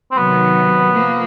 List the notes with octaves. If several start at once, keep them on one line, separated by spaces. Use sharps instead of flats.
C4
C3 D#3 F#3 B3
F3 A#3